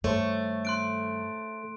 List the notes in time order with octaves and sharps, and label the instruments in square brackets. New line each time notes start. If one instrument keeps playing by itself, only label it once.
[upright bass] G2 D#3 [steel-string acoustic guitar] A3 [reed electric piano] A4 C5 C#5
[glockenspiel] C6 F#6 D7